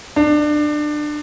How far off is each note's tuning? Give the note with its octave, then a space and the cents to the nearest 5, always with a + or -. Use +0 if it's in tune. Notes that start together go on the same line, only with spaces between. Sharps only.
D4 +25